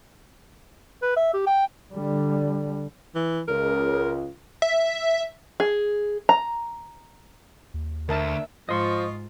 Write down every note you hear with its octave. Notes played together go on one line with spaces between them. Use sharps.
B4
E5
G4
G5
D3 G3
E3
C#2 A#4
E5
G#4
A#5
D#2
D2 A#4 E5 A5
G#2 F3 F4 D#5 C6 C#6